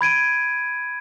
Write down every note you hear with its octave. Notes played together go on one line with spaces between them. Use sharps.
B5 G#6 D7 D#7